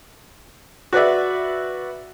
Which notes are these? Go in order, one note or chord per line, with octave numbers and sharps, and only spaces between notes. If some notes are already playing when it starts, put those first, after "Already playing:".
F#4 B4 D5 E5